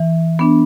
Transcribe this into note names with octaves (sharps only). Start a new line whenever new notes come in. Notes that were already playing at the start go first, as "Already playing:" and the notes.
Already playing: E3
B3 D4